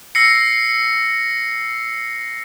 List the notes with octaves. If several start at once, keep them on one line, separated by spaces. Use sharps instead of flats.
E6 A#6 C7 C#7